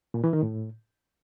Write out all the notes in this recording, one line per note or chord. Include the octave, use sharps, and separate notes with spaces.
A#2
E3
D#3
A2